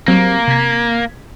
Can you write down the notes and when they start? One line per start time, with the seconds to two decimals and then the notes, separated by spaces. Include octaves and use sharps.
0.08 F#3 G3 A#3 C4
0.48 C3 G#6 B6